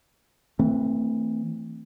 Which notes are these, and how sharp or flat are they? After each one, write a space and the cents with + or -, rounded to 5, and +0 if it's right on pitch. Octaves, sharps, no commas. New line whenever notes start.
E3 -20 A3 +30 C4 +0